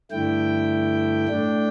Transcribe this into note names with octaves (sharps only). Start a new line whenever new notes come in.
G2 D3 A3 E4 G5
A2 A3 D4